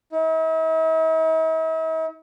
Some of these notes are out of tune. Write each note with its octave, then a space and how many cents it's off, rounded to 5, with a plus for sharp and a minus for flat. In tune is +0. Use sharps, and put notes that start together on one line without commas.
E4 -45